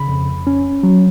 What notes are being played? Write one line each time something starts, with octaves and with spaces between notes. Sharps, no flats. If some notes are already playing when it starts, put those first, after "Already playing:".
Already playing: C#3 B5
F2
C#4
F#3